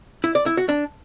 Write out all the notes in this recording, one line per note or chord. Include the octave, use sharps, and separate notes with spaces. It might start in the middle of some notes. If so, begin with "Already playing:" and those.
E4
D5
E4
F#4
D4